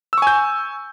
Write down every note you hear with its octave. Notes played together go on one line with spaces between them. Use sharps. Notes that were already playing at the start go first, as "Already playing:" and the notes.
G#5 C#6 E6 G6